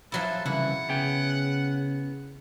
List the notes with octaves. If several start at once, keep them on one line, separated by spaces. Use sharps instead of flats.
F3 F#3 E4 A4
C2 C#3 E3 E4 F#5
C#3 B3 G#4 G5